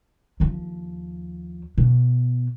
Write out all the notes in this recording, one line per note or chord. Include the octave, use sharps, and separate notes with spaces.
D#2 F3
B2